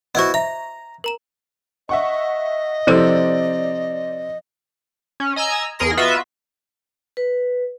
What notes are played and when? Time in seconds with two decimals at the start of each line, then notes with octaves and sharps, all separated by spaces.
0.15 B3 E4 F#4 C5 D#5
0.34 E5 A#5
1.04 A#4 A#5 E7
1.89 D#5 E5 F#5 C#6
2.87 C3 F3 C4 E4 A4 D5 E6
5.20 C#4
5.36 D#5 G#5 A#5 E6
5.79 E2 G#4 A#4 C6 A#6
5.97 B3 F4 F#4 B4 D#5 E5
7.17 B4